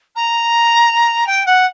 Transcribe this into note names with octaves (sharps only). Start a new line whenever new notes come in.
A#5
G5
F#5